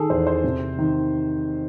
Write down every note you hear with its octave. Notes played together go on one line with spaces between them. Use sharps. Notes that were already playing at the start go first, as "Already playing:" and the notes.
Already playing: D#3 G#4 A4
E2 C5
C5
C3
D#3